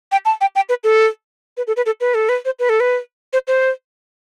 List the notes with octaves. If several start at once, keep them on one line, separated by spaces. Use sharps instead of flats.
G5
A5
G5
G5
B4
A4
B4
A4
B4
A4
B4
A4
B4
C5
B4
A4
B4
C5
C5